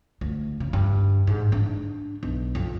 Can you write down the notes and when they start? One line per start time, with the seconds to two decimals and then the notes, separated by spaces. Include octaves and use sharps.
0.21 D2
0.60 C#3
0.73 G2
1.27 G#2
1.52 D4
2.23 B1
2.55 F2